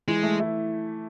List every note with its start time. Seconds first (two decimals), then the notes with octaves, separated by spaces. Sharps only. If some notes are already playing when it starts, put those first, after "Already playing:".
0.08 E3 G#3
0.23 A3
0.40 E4